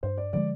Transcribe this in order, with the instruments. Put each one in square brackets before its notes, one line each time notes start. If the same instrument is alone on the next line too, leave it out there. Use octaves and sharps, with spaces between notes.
[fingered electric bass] G2 [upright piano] C5
[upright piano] D5
[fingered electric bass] D3 F3 G#3 [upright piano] D5